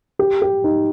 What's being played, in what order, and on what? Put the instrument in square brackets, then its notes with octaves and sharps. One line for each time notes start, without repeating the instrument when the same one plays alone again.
[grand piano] G4
G4
D#4